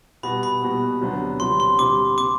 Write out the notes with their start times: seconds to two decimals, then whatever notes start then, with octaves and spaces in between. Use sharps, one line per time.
0.23 B2 G3 B3 F#4 B5
0.43 B5
0.63 B2 G3 B3 F#4
1.01 D2 C3 F#3 B3 D4
1.40 D2 C3 F#3 B3 D4 C6
1.60 C6
1.79 D2 C3 G3 D6
2.18 C3 G3 D6